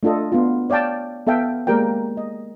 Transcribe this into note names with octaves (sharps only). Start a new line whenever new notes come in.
A3 D4 F4 A4 D#5
B3 D4 F4
C#5 D5 F5 G5 A5
B3 A4 E5 F5 G5
G#3 A#3 G4 A#4 D5 G5
D#5